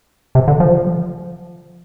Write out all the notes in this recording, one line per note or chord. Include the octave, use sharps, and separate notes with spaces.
C3
D3
F3